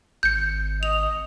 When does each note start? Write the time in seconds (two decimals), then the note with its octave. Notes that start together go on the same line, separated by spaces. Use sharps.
0.23 G#1 G6 C#7
0.83 D#5 F7